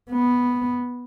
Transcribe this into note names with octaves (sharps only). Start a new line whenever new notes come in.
B3